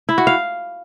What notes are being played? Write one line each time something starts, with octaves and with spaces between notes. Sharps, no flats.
E4
F#4
F5